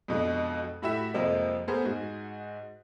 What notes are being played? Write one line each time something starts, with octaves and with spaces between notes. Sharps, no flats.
F2 B2 G#3 D4
A2 E4 F#4 G4 E5 E7
F2 C3 F3 G#3 A#3 C4
A3 B3 G#4 A#4 C5
G#2 F#4 G#4